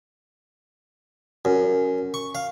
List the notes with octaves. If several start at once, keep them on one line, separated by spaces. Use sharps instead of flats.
F#2
C#6
F5